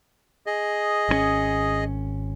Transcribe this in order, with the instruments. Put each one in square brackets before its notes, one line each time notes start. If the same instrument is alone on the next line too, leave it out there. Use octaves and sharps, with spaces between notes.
[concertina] G#4 D#5
[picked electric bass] G#1 D3 C#4